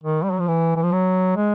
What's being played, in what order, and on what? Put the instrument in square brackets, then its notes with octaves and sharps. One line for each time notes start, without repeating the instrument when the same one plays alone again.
[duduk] D#3
G3
F#3
F3
E3
E3
F3
F#3
G#3